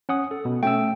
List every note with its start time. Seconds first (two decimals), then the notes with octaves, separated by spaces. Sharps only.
0.09 C#4 F#5 D#6
0.31 A4
0.45 B2
0.63 A3 C#4 G5 E6